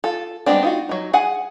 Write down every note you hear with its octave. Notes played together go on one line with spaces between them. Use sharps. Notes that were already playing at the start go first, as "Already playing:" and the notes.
F4 A4
G3 G#3 B3 C4 D4
D#4 F4 F#4
F#3 D#4
G#4 F#5 G#5